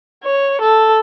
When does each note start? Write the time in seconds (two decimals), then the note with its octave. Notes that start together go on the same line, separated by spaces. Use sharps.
0.24 C#5
0.61 A4